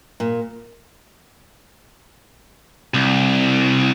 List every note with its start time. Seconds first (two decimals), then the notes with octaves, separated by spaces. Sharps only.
0.20 A#2
2.94 C2